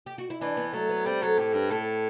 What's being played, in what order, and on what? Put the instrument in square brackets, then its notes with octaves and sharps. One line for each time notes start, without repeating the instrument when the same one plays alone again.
[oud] G4
F#4
E4
[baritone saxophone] E3 [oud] D4
[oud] B3
[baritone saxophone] F#3 [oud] A3
[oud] B3
[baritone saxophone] G3 [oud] C4
[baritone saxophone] F#3 [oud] A4
[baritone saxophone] A2 [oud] G4
[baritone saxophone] G2
[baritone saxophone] A2 [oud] A4